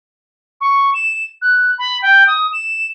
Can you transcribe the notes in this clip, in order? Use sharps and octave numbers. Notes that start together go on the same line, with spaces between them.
C#6
E7
F#6
B5
G5
D#6
E7